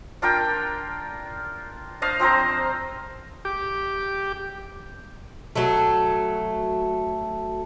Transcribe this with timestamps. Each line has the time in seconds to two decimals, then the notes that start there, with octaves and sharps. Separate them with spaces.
0.22 D4 F4 A#4 G5
2.02 D4 C5 D#5 F5
2.20 F3 C4 C5 A#5
3.45 G4 D6
5.56 F#3 A3